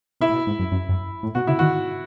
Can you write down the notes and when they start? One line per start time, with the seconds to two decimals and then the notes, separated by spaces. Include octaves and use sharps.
0.21 B2 E4
0.29 A2
0.34 B2
0.47 G#2
0.59 F#2
0.72 F#2
0.89 F#2
1.23 A2
1.35 B2 F#4
1.47 C#3 E4
1.59 D#3 F#4